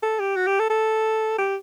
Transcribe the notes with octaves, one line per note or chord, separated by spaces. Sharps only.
A4
G4
F#4
G4
A4
A4
G4